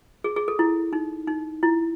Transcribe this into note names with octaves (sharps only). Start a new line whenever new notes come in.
G#4
G#4
A4
E4
D#4
D#4
E4